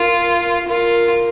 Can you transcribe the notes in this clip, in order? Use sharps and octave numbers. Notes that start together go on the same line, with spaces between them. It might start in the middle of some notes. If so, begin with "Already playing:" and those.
Already playing: F4 A#4
F4 A#4